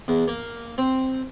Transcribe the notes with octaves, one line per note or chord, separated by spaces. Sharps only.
E2
A#3
C4